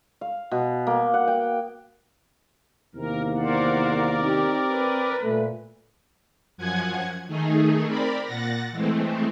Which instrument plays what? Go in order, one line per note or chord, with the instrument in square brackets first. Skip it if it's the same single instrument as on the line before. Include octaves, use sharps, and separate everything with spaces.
[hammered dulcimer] F5
B2
A#3
F#5
G5
[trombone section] E2 C3 D#3 [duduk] A#3 [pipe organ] A#4
[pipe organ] A#4 D5 [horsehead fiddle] C5 F#5
[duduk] C4 [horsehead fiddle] D#4 G4
[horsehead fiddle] B4
[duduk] A#2 [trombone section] A3
[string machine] F#2 F3 F#5 G#5 G#6
D#3 A3 D#4 G#4
C4 A#4 D5 B5
A#2 F#5 A6 A#6
E3 G#3 A3 C4